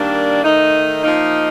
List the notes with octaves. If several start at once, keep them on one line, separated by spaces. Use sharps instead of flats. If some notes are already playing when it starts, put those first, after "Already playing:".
Already playing: D#3 G3 A#3 D4
D#3 A3 D#4
F3 A#3 D#4